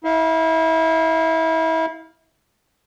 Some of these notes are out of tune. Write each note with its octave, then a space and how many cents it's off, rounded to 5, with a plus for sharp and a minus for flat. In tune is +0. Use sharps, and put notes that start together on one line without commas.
E4 -30 F5 +0